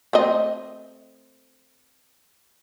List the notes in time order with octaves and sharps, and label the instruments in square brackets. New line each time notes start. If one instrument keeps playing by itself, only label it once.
[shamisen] A3 C4 D#5